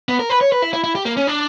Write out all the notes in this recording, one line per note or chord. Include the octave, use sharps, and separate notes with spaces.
B3
A#4
B4
C#5
B4
E4
E4
E4
G4
A#3
C#4
D4